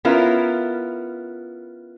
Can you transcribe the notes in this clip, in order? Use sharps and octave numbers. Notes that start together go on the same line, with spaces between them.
B3 C#4 E4 F4 A#4